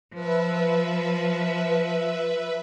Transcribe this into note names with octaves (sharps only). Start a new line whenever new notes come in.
F3 B4 E5